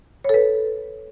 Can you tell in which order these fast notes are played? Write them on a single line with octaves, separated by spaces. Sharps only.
C#5 A4 B4